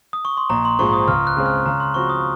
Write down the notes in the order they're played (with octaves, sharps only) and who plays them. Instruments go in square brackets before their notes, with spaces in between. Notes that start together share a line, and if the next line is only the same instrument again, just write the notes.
[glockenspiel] D#6
C#6
C6
[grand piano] A#1 [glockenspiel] A#5
[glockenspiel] C6
[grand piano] G#2 F3 G#3 [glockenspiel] C#6
[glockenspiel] D#6
[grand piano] C#2 [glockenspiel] F6
[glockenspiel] F#6
[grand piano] C#3 G#3 C4
[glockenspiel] F6
[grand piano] C#3 [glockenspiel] A#5
[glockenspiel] C6
[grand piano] F3 C4 F#4 [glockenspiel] C#6
[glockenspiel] D#6